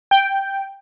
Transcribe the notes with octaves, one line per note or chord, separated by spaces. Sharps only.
G5